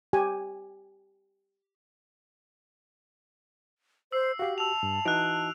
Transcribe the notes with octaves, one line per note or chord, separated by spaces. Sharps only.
G4 G#5
C5 E6 C7
F#4 G4 F5
A5 E6 F7
G2
E3 D#4 F#4 F#6 D7